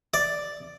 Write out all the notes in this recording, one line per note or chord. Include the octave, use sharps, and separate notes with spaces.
D5